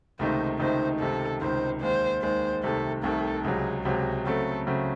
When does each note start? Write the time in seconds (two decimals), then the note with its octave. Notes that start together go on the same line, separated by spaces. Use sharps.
0.19 C#2 C3 D#3 A3 D#4 C5
0.59 C#2 C3 D#3 A3 D#4 C5
1.00 C#2 C3 D#3 A4
1.41 C#2 C3 D#3 C5
1.82 D#2 D#3 G#3 C5
2.22 D#2 D#3 G#3 C5
2.63 C2 C3 D#3 A3 A4
3.03 C2 C3 D#3 A3 A4
3.44 C#2 C3 F#3 G#4
3.85 C#2 C3 F#3 G#4
4.26 C#3 F#3 A3 C4 A4
4.67 C#3 F#3 A3 C4